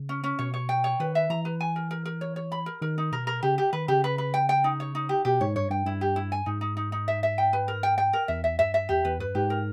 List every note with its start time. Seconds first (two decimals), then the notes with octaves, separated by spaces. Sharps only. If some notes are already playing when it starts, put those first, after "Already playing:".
Already playing: C#3
0.09 C#4
0.24 C#4
0.39 B2 C#5
0.54 C#5
0.69 G5
0.84 C#5
1.00 D#3 B4
1.15 E5
1.30 E3 A#5
1.45 B4
1.61 G#5
1.76 A#4
1.91 A#4
2.05 A#4
2.21 C#5
2.36 C#5
2.52 B5
2.66 A#4
2.82 D#3 A#4
2.98 D#4
3.12 B2 A#4
3.27 A#4
3.43 C#3 G4
3.58 G4
3.73 D#3 B4
3.88 C#3 G4
4.04 B4
4.18 B4
4.34 G5
4.49 G5
4.64 D#4
4.80 C#5
4.95 D#4
5.09 G4
5.25 B2 G4
5.41 G#2 C#5
5.56 G2 C#5
5.70 G2 G5
5.86 G2 E4
6.01 G4
6.16 E4
6.32 G#5
6.46 G#2 D#4
6.61 D#4
6.77 D#4
6.92 D#4
7.08 E5
7.23 E5
7.38 G5
7.53 B4
7.68 A#4
7.83 G5
7.98 G5
8.13 A#4
8.28 E2 E5
8.44 E5
8.59 G2 E5
8.74 E5
8.89 E2 G4
9.05 E2 B4
9.20 G2 B4
9.35 G#2 G4
9.50 A#4